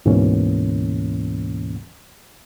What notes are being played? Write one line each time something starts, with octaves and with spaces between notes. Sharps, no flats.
D2 G#2 B2 E3 A#3 C#4